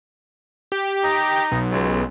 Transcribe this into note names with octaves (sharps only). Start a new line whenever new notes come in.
G4
D#4
B1
C#2